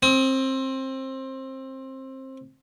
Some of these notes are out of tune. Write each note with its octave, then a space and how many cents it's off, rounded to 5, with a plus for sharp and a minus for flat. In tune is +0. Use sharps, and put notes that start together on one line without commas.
C4 +20 D#6 +40